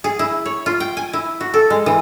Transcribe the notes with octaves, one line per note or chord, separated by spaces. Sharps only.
G#4
E4
C#5
F4
G5
G#5
E4
F#4
A4
G#3
E3